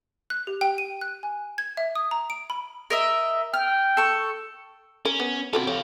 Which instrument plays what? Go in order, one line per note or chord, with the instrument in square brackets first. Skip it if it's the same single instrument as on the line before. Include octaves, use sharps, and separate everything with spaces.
[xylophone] F#6
G4
G5
D#7
F#6
G#5
G#6
E5
D#6
A#5
D7
B5
[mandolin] A#4 D#5 E5
[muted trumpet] G5 [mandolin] F6
[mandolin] A4 C#6
[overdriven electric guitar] C#4 [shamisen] A#4
[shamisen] B3
[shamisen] C4 F#4 A4 [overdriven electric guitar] F4 B5
[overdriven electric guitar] G4 F5 [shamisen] C#5